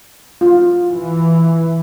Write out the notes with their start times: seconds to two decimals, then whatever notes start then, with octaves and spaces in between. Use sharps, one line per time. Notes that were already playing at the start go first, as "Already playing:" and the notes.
0.41 F4
0.89 E3